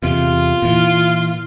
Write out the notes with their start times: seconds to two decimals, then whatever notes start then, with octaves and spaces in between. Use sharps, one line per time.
0.02 E2 C3 F4
0.62 A#2 E3